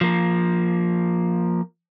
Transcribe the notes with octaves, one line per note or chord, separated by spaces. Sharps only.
F3 A#3